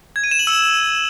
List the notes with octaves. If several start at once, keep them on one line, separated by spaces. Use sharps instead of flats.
G#6
D#7
E7
F#7
E6